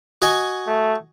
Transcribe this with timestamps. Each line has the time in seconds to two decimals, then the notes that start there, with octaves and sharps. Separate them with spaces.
0.22 F#4 D#5 G#5
0.67 A3